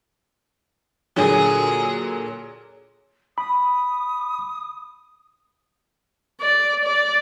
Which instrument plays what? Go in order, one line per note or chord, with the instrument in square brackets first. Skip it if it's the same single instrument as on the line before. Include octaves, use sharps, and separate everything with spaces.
[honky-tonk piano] A#2 D3 F#3 [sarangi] G#4
[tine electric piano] B5 [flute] D#6
[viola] D5
D5